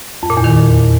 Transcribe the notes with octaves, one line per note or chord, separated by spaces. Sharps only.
F2
A#2
E2
D#3